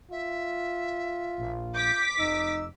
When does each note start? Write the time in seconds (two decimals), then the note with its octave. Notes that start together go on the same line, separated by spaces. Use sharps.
0.11 F4 E5
1.38 A#1
1.74 D6 G6 B6
2.19 F1 D#4 E6